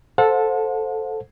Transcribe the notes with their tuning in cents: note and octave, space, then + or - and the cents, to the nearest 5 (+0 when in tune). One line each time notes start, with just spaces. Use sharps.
A4 +0 C5 +0 F#5 -40